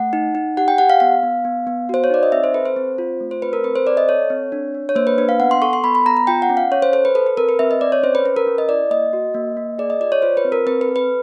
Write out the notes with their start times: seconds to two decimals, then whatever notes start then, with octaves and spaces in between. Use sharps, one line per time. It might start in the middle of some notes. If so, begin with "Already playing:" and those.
Already playing: A3 F#5
0.13 D#4
0.35 D#4
0.57 G4 F#5
0.68 G5
0.78 G4 F#5
0.90 F5
1.00 B3 F5
1.23 B3
1.45 B3
1.67 B3
1.89 F#4 C5
2.04 C#5
2.10 D#4 D5
2.23 D#5
2.32 C4 E5
2.44 C5
2.54 A4 B4
2.65 C5
2.76 C4
2.98 F4
3.21 A3
3.31 C5
3.42 C4 B4
3.53 A#4
3.64 C4 B4
3.76 C5
3.86 A4 D5
3.97 D#5
4.08 A4 C#5
4.30 C4
4.52 D4
4.74 D4
4.89 C#5
4.96 A#3 C5
5.07 B4
5.18 D4 B4
5.29 F5
5.40 B3 F#5
5.51 C6
5.62 A4 C#6
5.73 C6
5.84 B3 B5
5.95 B5
6.06 B3 A#5
6.17 A#5
6.27 F4 G5
6.42 F#5
6.49 C#4
6.57 F5
6.72 C#4 C#5
6.82 C5
6.93 A4 C5
7.05 B4
7.15 A4 B4
7.27 B4
7.37 C4 A#4
7.49 B4
7.59 C4 E5
7.71 D#5
7.81 C4 D5
7.92 C#5
8.03 C#4 C5
8.15 B4
8.25 C#4 B4
8.36 A#4
8.47 C#4
8.58 D#5
8.69 E4 D5
8.91 A#3 D#5
9.13 F#4
9.34 A#3
9.57 A#3
9.79 G#4 D5
9.90 D#5
10.01 F4 D5
10.12 C#5
10.22 F4 C5
10.37 B4
10.45 C4
10.52 A#4
10.67 C4 B4
10.81 B4
10.88 A4
10.96 B4